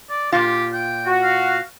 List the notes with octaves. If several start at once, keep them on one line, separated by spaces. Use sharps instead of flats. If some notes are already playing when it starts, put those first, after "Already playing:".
D5
A#2 F4 G4
G5
F#4
F5